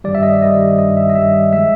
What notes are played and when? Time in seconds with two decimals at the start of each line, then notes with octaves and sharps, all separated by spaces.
0.04 G2 D#3 G3 D5
0.15 E5
0.23 D#5
0.32 D5
0.41 G2 D#3 G3 D#5
0.79 G2 D#3 G3 D#5
0.97 E5
1.10 D#5
1.15 G2 D#3 G3 E5
1.53 F3 G#3 E5